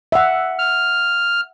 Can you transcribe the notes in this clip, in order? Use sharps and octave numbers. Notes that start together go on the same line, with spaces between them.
E5 F#5
F6